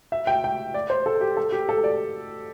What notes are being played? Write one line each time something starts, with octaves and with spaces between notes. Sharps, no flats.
E5
G5
G5
D5
C5
A4
G4
A4
G4
A4
D5